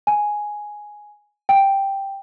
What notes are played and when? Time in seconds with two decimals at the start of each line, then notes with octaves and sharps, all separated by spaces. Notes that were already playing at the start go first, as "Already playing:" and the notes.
0.07 G#5
1.49 G5